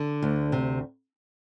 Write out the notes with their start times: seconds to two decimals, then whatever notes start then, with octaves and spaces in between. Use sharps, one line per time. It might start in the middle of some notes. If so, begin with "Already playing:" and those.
Already playing: D3
0.22 D2
0.52 C3